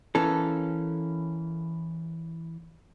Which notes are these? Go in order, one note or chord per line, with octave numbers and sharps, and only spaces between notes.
E3 A#3 C#4 A4